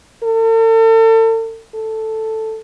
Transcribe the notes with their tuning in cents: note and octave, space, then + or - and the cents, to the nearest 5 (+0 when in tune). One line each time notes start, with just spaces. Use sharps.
A4 +40
A4 +0